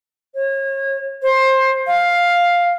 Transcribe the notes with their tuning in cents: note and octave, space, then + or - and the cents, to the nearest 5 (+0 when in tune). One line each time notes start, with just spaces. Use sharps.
C#5 -30
C5 +20
F5 +5